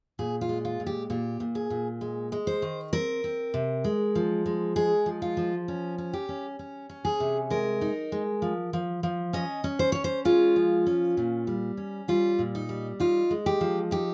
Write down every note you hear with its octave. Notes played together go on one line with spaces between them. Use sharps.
A#2 G#4
F4
G#3
F4
A#2
G4
A#2 G4
A#2
G#4
A#2
G#3
G#3
C5
D#3
C4 A#4
C4
C3
G#3
F3
G#3
G#3 G#4
F3
F4
F3
C#4
C#4
G4
C#4
C#4
C#4
G#4
C3
G#3 A#4
D#4
G#3
F3
F3
F3
C#4 D#5
C#4
C5
C#4 C#5
C5
G#3 F4
F3
C#4
A#2
G3
C#4
G3 F4
A#2
D#4
G3
D#4 F4
G#3
G4
F3
D#4 G4